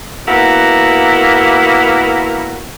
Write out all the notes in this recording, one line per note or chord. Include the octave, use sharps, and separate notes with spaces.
A#3 B3 E4 F#4 A#4